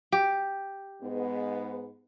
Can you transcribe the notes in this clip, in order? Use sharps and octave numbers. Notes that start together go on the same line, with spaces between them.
G4
G#2 B3